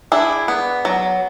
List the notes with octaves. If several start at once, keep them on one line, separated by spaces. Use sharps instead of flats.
D4 E4 G#4
B3
F#3